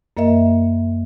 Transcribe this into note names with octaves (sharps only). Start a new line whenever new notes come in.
F#2 A#3 A#4 D#5 E5